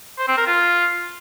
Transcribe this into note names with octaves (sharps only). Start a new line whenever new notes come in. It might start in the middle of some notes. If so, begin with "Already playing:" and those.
C5
C4
A#4
F4